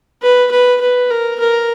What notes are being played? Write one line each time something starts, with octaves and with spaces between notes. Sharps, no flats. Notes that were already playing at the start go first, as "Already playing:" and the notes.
B4
B4
B4
A#4
A#4